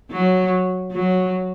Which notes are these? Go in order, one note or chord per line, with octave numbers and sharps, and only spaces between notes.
F#3
F#3